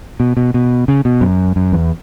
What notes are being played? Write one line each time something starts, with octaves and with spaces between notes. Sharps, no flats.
B2
B2
B2
C#3
B2
F#2
F#2
E2